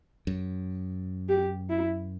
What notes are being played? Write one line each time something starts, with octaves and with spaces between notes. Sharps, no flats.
F#2
G4
E4